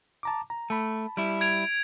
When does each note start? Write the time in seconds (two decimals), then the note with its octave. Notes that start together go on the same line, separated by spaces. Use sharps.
0.23 A5 A#5 D6
0.50 A#5
0.70 A3 A5 B5
1.17 G3 E4
1.41 G#6 D7 F7